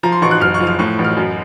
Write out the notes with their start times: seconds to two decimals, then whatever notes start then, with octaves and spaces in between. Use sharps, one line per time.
0.03 F3 A#5
0.12 C6
0.22 A1 C#6
0.31 F#6
0.41 F#1 F6
0.54 C#6
0.60 F3
0.67 F6
0.79 A2 C#6
0.99 A1
1.04 F6
1.17 F#2